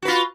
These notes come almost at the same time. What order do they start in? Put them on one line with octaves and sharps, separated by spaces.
F#4 B4 F4